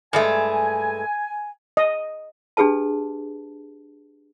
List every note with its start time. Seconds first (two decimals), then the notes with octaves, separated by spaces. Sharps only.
0.13 G2 G#3 A3 G#5
1.77 D#5
2.57 D4 G4 G#4 B4 A5